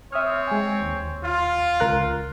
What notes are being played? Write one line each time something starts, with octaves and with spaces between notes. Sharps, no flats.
C4 C#5 E5 D#6 F6
G#3 G#5
D#2
F4
C#2 A#4 F#6